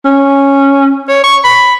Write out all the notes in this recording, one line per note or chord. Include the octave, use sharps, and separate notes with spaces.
C#4
C#5
C#6
B5